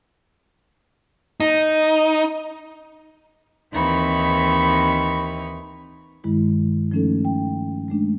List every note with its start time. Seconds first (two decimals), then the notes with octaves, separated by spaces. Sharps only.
1.40 D#4
3.73 D#2 E3 C4 D#4 B5 C#6
6.24 G2 D#3 G#3 E4
6.92 F3 A3 C#4 D#4 A4
7.25 G5
7.88 G#3 A3 D4